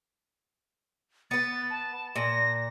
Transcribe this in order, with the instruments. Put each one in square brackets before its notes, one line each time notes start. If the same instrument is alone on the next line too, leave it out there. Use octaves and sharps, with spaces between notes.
[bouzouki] B3 B4 [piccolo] A6
[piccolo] A5
[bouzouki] A#2 [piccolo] A#6